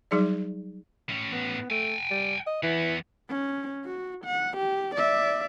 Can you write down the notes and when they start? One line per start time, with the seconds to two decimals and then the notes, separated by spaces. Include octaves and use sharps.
0.11 F#3 G3 D#4 G#4 D5
1.09 A2 C#4
1.32 B3
1.70 A3 G5 G#5
2.11 G3
2.47 D#5
2.63 E2 E3 B3
3.29 C#4
3.85 F#4
4.25 F#5
4.57 G4
4.95 D5 E5